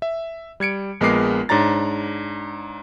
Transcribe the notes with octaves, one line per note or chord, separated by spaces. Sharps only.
E5
G3 G#6 C#7 D7
A#1 G#3 B3 A#4 D6 C7
G#2 D4 C#5 A#5 A6